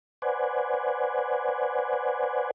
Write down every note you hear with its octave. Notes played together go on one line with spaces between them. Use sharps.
B4 C5 D5 F#5 G#5